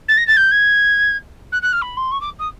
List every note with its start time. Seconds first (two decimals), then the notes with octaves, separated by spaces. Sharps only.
0.08 A6
0.17 A#6
0.27 A6
0.37 G6
0.51 G#6
1.52 F#6
1.62 F#6
1.72 F6
1.81 B5
1.97 C6
2.11 C#6
2.21 D6
2.39 D#6